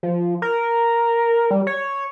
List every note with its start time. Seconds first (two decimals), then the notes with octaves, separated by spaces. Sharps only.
0.03 F3
0.42 A#4
1.51 G3
1.67 C#5